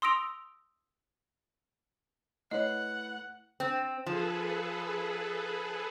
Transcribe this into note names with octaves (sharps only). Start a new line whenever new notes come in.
C6 D#6 E6 A#6 D7 F7
A3 E4 B4 C#5 D#5 F#5
C4
F3 G#4 A4 B4